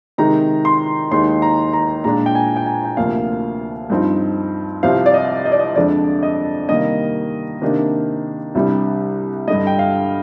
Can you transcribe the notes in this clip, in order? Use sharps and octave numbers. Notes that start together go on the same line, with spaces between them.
C3 D#3 G#3 D#4 A#5
C6
D#2 D#3 G#3 D#4 C6
A#5
A#5
A#2 G#3 D4 A#5
G5
G#5
G5
G#5
G5
D2 C3 F3 A#3 F5
G2 F3 C4 D#4
C2 C3 F3 C4 F5
D5
D#5
D#5
D5
D#5
F2 D3 G#3 D4 D5
D#5
C3 D#3 G3 A#3 D#5
C3 D#3 A#3 D4
C2 C3 G3 D4
G2 D3 G3 D#5
G5
F5